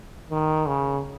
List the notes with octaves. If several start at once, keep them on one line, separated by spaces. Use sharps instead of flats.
D#3
C#3